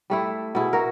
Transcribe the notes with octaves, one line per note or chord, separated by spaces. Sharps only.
G3 A3 E4
B2 E4 G#4
F#4 A#4